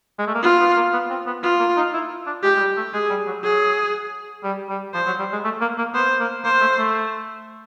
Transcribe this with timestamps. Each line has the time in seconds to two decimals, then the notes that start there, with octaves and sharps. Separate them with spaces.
0.19 G#3
0.27 A3
0.35 A#3
0.43 B3 F4
0.60 B3
0.76 A#3
0.93 B3
1.10 C4
1.27 B3
1.43 B3 F4
1.60 A#3
1.77 D#4
1.94 E4
2.27 D4
2.43 G#3 G4
2.56 G#3
2.60 G3
2.77 A3
2.94 G#3 G#4
3.10 G3
3.27 F#3
3.43 F#3 G#4
4.44 G3
4.69 G3
4.94 F3 C5
5.07 F#3
5.19 G3
5.32 G#3
5.44 A3
5.61 A#3
5.78 A#3
5.94 B3 C5
6.20 A#3
6.45 A#3 C5
6.61 A3
6.78 A3